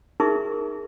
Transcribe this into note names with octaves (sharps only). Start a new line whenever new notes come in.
D#4 G#4 A#4 E5 C#6